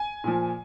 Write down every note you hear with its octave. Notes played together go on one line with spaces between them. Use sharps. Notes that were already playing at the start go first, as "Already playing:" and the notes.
Already playing: G#5
A#2 F3